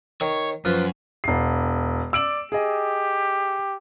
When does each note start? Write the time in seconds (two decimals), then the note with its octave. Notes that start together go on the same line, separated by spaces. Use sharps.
0.21 D#3 C#5
0.65 F#2 F3 F4 B4
1.24 E1 C7
2.13 D5 E6 D7 F#7
2.52 G4 G#4 D#5